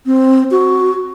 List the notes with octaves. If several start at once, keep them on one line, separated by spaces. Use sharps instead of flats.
C4
F#4